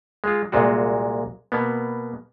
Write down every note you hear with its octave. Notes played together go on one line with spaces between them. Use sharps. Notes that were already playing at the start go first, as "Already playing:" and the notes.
G#3 F4
C2 A#2 G#3 F4 F#4
B2 A#3 B3